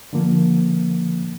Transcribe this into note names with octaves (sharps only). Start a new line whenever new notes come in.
D3 F3 A#3